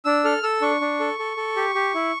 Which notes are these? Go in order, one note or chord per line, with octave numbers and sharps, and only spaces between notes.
D4 E6
A4 F6
A4 E6
D4 C#6
D4
A4
A4
A4
G4
G4
E4